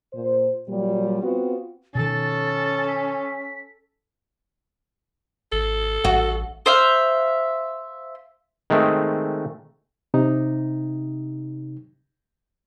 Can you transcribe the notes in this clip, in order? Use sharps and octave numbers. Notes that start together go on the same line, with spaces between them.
A#2 C5
A#2 F#3 G3
B3 C4 F4 F#4
B2 D#3 C#4 A4 A6
B6
G#1 A4
A1 F#4
C5 E5 F5
D#3 G#3 A3 C4
C3 D#4